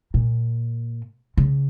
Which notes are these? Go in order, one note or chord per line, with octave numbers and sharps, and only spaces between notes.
A#2
C#3